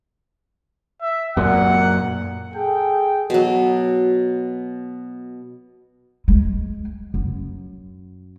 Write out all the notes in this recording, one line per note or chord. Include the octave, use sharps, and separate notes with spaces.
E5
F#2 A#2 F#5
G#4 A4 G5
B2 F#3
G#3
F#2